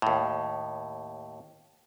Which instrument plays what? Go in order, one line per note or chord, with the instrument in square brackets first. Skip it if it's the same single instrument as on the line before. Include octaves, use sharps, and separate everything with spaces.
[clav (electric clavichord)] D#2 A2